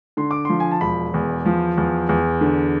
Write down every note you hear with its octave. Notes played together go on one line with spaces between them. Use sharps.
D3 C6
D6
F3 C6
G#5
A5
E1 B5
E2
F3
E2
E2
D3